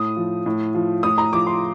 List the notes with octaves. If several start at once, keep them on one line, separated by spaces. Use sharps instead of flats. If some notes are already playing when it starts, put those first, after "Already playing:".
Already playing: A2 D#6
F3
A2
F3
A2 D#6
A#5
F3 D6
C6